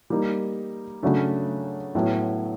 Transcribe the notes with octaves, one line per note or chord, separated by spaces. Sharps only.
G3 A#3 D#4
C#3 F#3 A3 D4
A2 F#3 B3